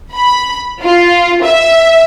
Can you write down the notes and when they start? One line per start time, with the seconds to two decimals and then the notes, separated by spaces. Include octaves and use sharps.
0.13 B5
0.83 F4
1.45 E5